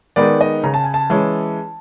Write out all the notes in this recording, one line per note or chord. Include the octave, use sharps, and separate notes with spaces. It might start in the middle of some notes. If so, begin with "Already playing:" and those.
D#3 G#3 B3 D#4 D5
D#5
C#3 A#5
A5
G#5
A5
E3 G#3 C#4